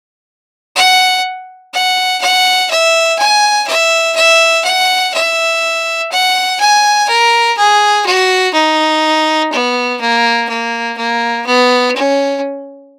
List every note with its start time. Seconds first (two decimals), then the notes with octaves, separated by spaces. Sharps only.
0.76 F#5
1.73 F#5
2.21 F#5
2.70 E5
3.18 G#5
3.68 E5
4.16 E5
4.65 F#5
5.13 E5
6.11 F#5
6.60 G#5
7.08 A#4
7.57 G#4
8.06 F#4
8.54 D#4
9.52 B3
10.00 A#3
10.49 A#3
10.97 A#3
11.46 B3
11.96 C#4